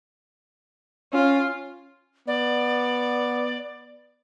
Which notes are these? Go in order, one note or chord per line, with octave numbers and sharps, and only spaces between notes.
C#4 F4
B3 D5